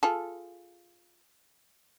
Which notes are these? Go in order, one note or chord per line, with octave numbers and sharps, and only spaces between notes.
F4 G#4 A4